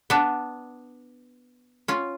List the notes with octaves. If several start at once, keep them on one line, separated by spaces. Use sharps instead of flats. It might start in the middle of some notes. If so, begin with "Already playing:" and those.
B3 D4
C#4 F4